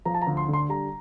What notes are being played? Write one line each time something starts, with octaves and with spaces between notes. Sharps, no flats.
F3 A#5
A5
A#5
D2
C6
D3
C6
G3 A#5